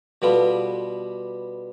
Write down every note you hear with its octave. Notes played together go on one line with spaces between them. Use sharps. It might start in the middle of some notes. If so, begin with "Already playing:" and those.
B2 G3 B3 F4 A4